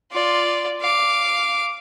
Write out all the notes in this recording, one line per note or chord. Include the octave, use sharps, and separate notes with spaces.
F4 D5
F5 D6